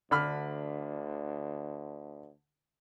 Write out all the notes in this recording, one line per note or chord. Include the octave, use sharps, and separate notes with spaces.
D2 D3 B5 F6